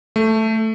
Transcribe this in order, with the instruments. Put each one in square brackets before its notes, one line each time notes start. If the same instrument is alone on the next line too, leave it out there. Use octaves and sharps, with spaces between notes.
[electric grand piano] A3